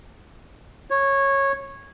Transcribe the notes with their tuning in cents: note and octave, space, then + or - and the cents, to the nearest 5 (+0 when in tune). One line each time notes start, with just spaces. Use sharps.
C#5 -15